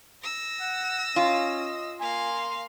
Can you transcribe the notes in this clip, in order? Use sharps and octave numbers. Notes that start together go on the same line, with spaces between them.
E6 A#6
F#5
C#4 F4 D#5
A#3 F5 G#5 C6